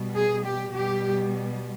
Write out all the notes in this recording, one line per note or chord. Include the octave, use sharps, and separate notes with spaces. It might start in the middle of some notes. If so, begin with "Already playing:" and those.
Already playing: B2 G3
G#4
G4
B2 G3 G4